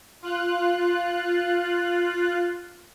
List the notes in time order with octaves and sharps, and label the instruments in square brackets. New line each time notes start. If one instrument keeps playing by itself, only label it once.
[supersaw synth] F4 F#6